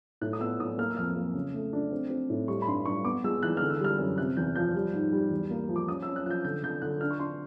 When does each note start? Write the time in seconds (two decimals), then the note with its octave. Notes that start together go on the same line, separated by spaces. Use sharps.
0.21 A2 F#6
0.33 D#6
0.40 B3 E6
0.59 A2 D#6
0.78 A#3 F6
0.90 E6
0.97 F2 F6
1.16 A#3
1.34 C#3
1.54 A3
1.73 D4
1.92 C4
2.10 C4
2.30 A2
2.48 G3 C#6
2.62 B5
2.67 G2 C6
2.86 G2 C#6
3.04 B3 D6
3.24 G#3 E6
3.43 E3 F#6
3.57 D3 F6
3.70 E6
3.80 G3 F6
3.99 F#2
4.18 C3 F#6
4.37 E2 G6
4.55 F3 G6
4.75 G3
4.93 G#2
5.13 G3
5.31 E2
5.51 A#3
5.69 F3
5.76 D6
5.87 C#4 D#6
6.02 E6
6.07 C#4
6.16 F#6
6.26 F3 F#6 G6
6.44 D3 G6
6.63 D3 G6
6.82 D3 F#6
7.01 D4 F6
7.11 C#6
7.20 D4 C6